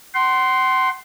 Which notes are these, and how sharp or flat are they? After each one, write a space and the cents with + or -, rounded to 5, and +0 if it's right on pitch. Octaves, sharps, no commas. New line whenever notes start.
F#5 +35 C6 +0